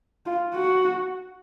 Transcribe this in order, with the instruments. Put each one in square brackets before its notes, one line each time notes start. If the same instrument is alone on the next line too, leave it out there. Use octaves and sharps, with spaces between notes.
[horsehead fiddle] F4
F#4